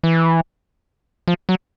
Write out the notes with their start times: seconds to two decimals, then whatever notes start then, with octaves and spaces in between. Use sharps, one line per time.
0.03 E3
1.28 F3
1.49 F#3